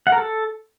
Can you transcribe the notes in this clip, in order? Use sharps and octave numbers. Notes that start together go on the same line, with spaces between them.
F#5
A#4
A4